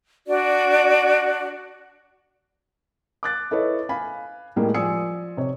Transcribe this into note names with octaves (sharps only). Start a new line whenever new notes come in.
D4 F#4 D5
D6 F#6 A6
E4 A4 B4 C#5 D#5 E5
F5 G#5 B5
A2 G3 G#3 A#3
F3 D5 G#5 D#6 E6 C#7
C3 C#5